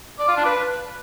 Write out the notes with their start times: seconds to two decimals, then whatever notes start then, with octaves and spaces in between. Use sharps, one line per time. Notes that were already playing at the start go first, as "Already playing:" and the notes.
0.19 D5
0.28 F4
0.37 D4
0.45 B4